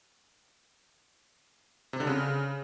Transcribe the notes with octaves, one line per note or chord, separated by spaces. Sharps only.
C3
D3
C#3